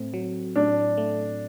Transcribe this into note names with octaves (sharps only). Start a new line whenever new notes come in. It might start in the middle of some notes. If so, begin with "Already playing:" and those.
Already playing: A2 A3 C4
F#3
A2 D4
A3